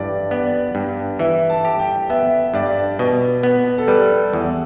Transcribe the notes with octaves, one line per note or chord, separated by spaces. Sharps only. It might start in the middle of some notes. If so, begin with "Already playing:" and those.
Already playing: G2 E3 D5
B3 D5
G2
E3 E5
A5
G4
G5
B3 E5
G2 D5
B2
B3
A4
G3 B4
E2